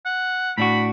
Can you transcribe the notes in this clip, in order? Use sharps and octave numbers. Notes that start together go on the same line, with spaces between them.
F#5
A2 D4 F#4 B5